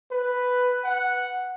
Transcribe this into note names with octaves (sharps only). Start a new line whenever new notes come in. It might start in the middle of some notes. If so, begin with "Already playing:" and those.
B4
F#5